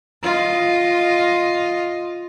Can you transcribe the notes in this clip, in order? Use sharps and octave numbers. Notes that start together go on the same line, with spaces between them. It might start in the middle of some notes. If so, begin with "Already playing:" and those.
F4 D#5